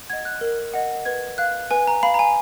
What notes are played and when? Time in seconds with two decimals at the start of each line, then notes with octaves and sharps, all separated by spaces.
0.10 F#5 G#6
0.13 D#5
0.25 F#6
0.41 A#4
0.74 D#5 F#5
1.05 B4 G#6
1.38 F5 F#6
1.71 B4 G#5
1.87 A#5
2.03 F5 B5
2.14 A#5
2.19 G#5